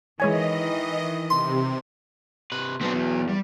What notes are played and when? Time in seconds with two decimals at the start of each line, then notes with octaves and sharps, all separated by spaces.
0.20 D#3 E3 G#3 C#5 D#5 G#5
1.30 C3 C6
2.52 C3 B4
2.81 F#3 B3 C4 D4
2.94 E2
3.29 G3